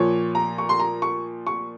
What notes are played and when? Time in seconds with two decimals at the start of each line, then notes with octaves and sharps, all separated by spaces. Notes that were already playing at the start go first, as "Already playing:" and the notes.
Already playing: A#2 F3 C#5
0.35 A#5
0.58 C#6
0.69 C6
0.80 A#5
1.02 C#6
1.47 C#6